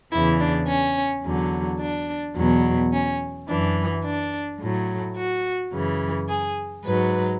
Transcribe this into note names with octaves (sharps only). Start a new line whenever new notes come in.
E2 C#3 E3 E4
D4
C#4
E2 D3 F#3
D4
E2 B2 F#3
C#4
F#2 E3 D4
D4
A2 F#3
F#4
F#2 C#3 E3
G#4
G#2 F#3 B4